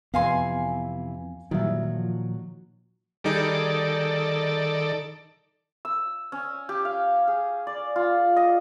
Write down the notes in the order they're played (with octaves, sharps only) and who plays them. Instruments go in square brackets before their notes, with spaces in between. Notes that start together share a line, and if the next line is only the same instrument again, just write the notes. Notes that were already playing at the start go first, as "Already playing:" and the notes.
[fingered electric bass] F2 [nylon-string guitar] C3 E3 [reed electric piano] B3 [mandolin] F5 G#5 C6
[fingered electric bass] A#2 D#3 [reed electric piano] E3 G3 E5 [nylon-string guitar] F#3
[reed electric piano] F3
[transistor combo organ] D#3 A4 D5 [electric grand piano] G3 D#4 G#4
[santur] E6
C#4
G4
F5
G#4
D5
F4
D#5